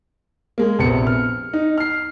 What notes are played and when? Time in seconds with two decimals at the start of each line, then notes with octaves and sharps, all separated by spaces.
0.58 G#3 A#3
0.79 A#1 C3 B3 C#7
1.07 F6
1.54 D#4
1.78 F6 C7